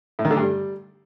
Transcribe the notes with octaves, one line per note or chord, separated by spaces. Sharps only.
A2
D#3
D3
G2
G3